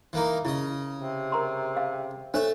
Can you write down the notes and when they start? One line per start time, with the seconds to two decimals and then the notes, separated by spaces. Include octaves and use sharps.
0.13 E3 A#3 D#4
0.45 C#3 E4 D#5
0.94 C3
1.32 A#4 A#5 C6
1.77 F5
2.34 A3 D4 C5 C#5 E5